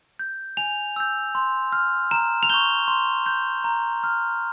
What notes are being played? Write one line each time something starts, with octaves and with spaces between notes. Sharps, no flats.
G6
G#5 F7
E6 G6
C6
F6
A#5 E7
F7
C#6 G6 G7
C6
G6
A#5
F6